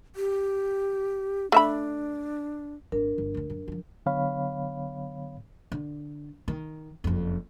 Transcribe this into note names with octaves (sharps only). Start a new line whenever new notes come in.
G4
A3 D4 E5 B5
G#1 D4 A#4
G1
D2 D3
F#2
D3 F3
D3 F#3 B3 C#5 F5 B5
D3
D#3
F#1 F2